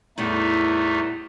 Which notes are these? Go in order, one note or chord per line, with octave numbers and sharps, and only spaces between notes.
E2 A2 G3 A3 B3 D#4